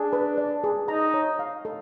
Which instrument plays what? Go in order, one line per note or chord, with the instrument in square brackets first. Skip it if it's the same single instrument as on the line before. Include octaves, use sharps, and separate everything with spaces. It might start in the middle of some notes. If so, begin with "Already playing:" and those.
Already playing: [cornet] D4 [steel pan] G#4
[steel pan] B4
D5
G#4
[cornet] D#4 [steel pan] A#5
[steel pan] C#5
F5
A4